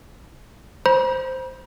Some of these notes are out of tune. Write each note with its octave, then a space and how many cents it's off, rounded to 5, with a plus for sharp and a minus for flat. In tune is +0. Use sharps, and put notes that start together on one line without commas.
C5 +0 B5 -45